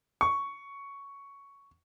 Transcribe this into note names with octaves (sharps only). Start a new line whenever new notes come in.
C#6